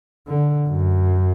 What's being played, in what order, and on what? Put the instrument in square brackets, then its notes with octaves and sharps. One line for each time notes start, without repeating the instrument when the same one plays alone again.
[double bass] D3
F#2